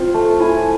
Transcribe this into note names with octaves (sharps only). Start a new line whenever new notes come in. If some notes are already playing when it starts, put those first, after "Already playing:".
Already playing: C4 F4
A3
E4 G#5